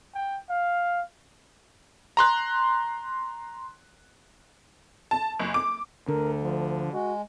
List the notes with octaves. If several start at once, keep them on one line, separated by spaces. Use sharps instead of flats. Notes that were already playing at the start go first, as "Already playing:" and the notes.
G5
F5
A#5 C6 F#6
A5
F#1
D6
D2 D3 A#4
F3
G#3 F#4